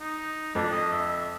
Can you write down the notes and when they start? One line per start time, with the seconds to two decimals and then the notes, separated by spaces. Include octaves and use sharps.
0.01 D#4
0.55 F2 D4
0.72 D#5
0.93 E5